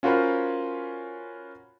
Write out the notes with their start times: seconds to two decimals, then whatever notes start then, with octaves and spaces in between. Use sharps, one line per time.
0.03 C#4 F4 F#4 A#4 C5 B5